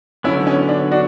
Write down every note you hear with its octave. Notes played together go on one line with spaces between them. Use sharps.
D3 F#3 B3 C#4 E4
C#4
D4
D4 F#4